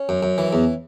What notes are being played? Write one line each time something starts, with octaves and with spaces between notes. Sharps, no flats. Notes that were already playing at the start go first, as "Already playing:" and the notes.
Already playing: C#4
F#2
F#2
E3
E2